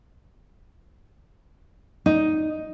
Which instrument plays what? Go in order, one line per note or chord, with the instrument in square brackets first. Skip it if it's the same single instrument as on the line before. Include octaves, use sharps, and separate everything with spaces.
[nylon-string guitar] D#4